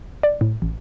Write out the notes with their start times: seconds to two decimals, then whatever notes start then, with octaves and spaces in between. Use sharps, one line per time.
0.23 D5
0.41 A2
0.62 A1